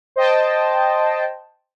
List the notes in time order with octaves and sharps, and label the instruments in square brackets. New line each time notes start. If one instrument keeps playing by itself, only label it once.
[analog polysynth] C5 D#5 G5 A5